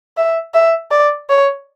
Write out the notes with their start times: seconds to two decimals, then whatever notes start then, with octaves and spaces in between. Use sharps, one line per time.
0.17 E5
0.54 E5
0.91 D5
1.30 C#5